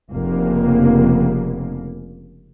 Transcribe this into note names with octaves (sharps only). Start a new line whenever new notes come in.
F1 F2 C#3 A#3